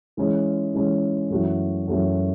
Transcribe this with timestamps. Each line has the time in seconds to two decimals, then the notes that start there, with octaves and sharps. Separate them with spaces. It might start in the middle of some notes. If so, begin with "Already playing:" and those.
0.17 E3 G#3 C#4
0.74 E3 G#3 C#4
1.30 F#2 E3 A3 C#4 F#4
1.88 F#2 E3 A3 C#4 F#4